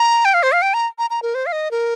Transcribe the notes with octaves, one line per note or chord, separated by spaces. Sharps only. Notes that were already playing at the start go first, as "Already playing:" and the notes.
Already playing: A#5
G5
F5
C5
F5
G5
A#5
A#5
A#5
A#4
C5
F5
D#5
A#4